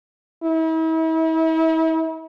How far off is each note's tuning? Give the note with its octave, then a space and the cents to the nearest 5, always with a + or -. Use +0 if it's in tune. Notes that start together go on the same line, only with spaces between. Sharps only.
E4 -40